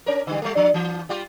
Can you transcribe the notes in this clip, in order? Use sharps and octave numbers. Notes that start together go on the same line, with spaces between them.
C#4 A#4
D3 G3
G3 A3
F3 D4
E3
G3 F4 G4